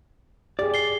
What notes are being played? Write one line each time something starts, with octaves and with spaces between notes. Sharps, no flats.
G4 G#4 D5
C7 G7